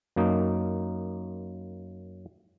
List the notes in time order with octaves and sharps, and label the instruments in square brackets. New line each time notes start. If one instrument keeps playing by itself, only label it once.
[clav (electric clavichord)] F#2 A#3 D#4